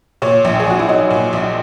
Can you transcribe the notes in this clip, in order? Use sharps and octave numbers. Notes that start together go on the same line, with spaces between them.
A#2 C#5
A#1
G#4
A#1 F#4
E4
F#3 D#4
A#2
A#1